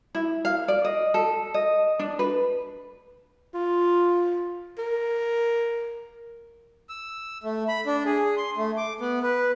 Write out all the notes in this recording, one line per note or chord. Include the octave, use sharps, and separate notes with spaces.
E4
F5
D5
D#5
A4
D#5
D4
B4
F4
A#4
E6
A3
B5
D4
G#4
C6
A3
D6
B3
B4